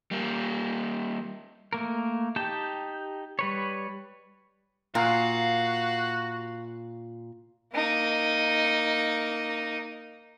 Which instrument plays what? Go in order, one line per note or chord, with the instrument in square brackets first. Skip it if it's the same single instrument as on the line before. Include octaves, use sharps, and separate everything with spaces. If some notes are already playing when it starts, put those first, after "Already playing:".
[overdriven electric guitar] G3 A#3
[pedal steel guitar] A3 A#3 A#4
D#4 G4 G5 A5
G3 B4 C#5
[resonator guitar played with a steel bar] A#2 [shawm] F#4 [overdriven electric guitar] F5
[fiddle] A#3 D#4